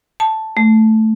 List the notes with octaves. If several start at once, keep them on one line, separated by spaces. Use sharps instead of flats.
A5
A3